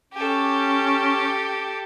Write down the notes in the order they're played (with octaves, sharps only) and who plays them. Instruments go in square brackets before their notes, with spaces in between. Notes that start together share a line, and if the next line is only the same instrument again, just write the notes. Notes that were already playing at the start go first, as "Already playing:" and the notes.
[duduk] C#4 [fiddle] G4 A4